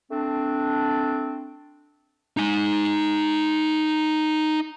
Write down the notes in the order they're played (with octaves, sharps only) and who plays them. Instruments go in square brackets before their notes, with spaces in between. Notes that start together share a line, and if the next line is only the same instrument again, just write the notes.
[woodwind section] A3 C4 D4
[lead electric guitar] D#4 G#5